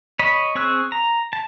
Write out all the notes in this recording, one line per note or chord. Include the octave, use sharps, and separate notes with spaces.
C#5 D#5 B5
C4 G#4 C#6 E6 F#6
A#5
A5